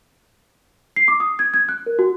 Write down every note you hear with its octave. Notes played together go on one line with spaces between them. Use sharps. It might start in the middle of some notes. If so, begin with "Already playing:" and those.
C7
D6
D#6
G#6
G#6
F#6
A#4
F#4